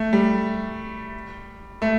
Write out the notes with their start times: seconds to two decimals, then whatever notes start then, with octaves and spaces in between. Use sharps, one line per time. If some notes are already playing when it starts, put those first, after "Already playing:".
Already playing: A3
0.13 G3
1.82 A3